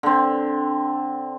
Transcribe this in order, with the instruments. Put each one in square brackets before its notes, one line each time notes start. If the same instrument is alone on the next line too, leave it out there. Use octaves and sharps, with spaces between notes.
[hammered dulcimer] D3 C4